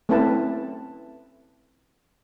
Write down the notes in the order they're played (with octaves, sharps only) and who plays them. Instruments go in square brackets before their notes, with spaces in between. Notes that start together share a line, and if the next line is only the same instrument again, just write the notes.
[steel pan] A3 C4 C#4 E4 B4 A5